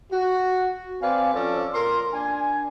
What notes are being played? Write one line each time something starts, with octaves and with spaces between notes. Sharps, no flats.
F#4
C4 B4 D5 F5 G#5
F3 C#4 A4 D5
A#2 A#4 C6
D4 G#5